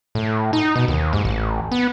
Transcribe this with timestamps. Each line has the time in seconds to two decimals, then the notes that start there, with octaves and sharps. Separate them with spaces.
0.15 A2
0.53 D#4
0.76 B2
0.88 D#2
1.13 G#2
1.25 A1
1.72 B3